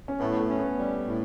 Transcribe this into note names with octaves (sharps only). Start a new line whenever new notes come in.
C#4
A2 B3
A3
C#4
B3
G3
A2